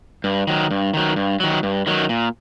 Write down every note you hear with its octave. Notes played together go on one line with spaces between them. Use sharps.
G2
D#3 F#3
G2
D#3 F#3
G2
D#3 F#3
G2
D#3 F#3
A#2